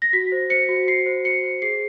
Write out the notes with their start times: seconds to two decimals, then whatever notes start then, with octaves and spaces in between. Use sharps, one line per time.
0.02 A#6
0.13 F#4 B6
0.32 C5
0.50 C5 C#7
0.69 F#4
0.87 F#4 C7
1.06 C5
1.24 F#4 C#7
1.43 C5
1.62 G#4 C7